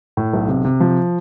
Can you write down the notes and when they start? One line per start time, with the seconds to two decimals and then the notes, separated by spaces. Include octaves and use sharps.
0.17 A2
0.33 B1
0.48 C3
0.65 C3
0.80 F3